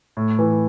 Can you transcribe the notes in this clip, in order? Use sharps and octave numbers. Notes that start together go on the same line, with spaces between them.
A2
E3